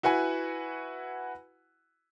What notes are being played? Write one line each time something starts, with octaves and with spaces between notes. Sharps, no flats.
E4 F#4 B4 F#5 G#5